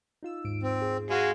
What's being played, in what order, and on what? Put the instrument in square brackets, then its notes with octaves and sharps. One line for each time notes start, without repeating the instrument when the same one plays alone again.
[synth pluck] D#4 F4 E6
D#2 G#2 D7
[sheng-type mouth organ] C4
[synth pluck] G#4
G#4
[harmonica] G#3 [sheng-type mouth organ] F#4 F5 G#5